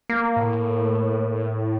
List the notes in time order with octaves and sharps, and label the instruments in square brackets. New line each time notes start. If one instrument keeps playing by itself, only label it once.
[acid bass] A#3
[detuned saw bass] A2